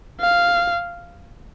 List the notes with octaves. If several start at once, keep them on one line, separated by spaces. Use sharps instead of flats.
F5